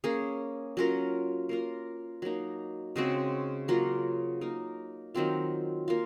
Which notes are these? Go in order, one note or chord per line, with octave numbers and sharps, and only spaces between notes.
A#3 C#4 G#4
F#3 C#4 F4 A#4
A#3 F4 A#4
F#3 A#3 D#4
C#3 G#3 C4 F#4
F#3 A#3 F4 A#4
A#3 D#4 A#4
D#3 F#3 C4 F4
A#3 F4